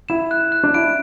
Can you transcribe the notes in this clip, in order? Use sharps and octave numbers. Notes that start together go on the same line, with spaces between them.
E4 E7
F#6
F#6
D4
E4 D7